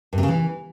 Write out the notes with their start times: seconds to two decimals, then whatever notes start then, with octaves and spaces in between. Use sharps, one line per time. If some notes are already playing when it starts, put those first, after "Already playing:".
0.13 G2
0.18 C3
0.23 C#3
0.28 E3